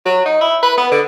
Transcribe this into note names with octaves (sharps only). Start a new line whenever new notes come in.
F#3
D#4
E4
B4
B3
D3